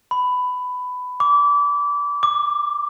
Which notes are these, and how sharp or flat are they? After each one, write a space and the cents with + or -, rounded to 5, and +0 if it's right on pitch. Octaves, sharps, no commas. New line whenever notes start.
B5 +15
D6 -25
D6 +10